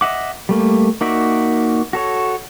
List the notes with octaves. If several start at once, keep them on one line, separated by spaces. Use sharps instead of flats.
D#5 E5 F#5 D6
G3 A3 A#3
A#3 D#4 F#4 D5 E5
F#4 A4 C#5